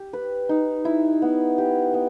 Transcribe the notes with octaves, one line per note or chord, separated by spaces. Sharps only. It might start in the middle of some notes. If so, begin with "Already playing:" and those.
Already playing: G4
B4
D#4
E4
B3
G4
B3